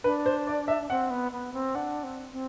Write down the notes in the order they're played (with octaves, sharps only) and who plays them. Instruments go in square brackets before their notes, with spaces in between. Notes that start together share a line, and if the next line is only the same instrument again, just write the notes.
[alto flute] D4 [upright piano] B4
[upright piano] C5
D5
E5
[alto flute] C4 [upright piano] F#5
[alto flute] B3
B3
C4
[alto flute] D4 [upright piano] F#5
[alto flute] C4
C4